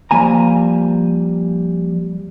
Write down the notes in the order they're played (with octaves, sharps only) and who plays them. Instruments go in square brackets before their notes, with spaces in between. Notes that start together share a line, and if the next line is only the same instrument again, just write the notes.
[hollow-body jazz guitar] F3 G3 A#3 G#5 A#5